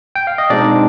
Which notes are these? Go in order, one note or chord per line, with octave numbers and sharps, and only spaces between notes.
G5
F5
D#5
B2 G#3 C4 D4 D#4 D5